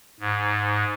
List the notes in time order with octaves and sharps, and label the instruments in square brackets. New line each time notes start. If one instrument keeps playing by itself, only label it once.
[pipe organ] G#2